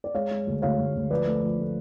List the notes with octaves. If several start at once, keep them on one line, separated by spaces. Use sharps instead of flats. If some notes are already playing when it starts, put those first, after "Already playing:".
D5
G#3 C#5 F5
G#3
D2
D2 C#5 F5
D2
D2
F3 B4 D5
A3
F3
A3